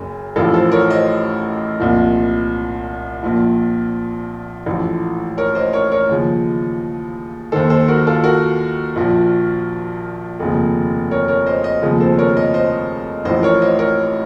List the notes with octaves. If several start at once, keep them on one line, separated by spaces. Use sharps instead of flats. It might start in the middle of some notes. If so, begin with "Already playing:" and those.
Already playing: F#1 F#2
A1 A2 F3 F4 A4
A4 C5
A#4 C#5
C5 D#5
C2 A#2 F3
A#1 A#2 F3
A1 A2 F3
A#4 C#5
C5 D#5
A#4 C#5
A#4 C#5
D#2 C#3 F3
D#2 D#3 A4 C5
A4 C5
F#4 A#4
F4 A4
F#4 A#4
A#1 A#2 F3
F1 D#2 C#3 F3
A#4 C#5
A#4 C#5
C5 D#5
C5 D#5
F1 D#2 C#3 F3
A4 C5
A#4 C#5
D#5
C5 D#5
A1 A2 F3 C5 D#5
A#4 C#5
C5 D#5
A#4 C#5